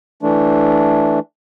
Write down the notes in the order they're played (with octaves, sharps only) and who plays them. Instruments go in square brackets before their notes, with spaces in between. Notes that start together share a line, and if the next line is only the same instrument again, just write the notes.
[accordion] E3 A3 D4